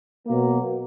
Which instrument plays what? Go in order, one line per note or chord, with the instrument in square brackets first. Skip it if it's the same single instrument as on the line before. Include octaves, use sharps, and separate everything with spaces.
[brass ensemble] B2 F#3 A#3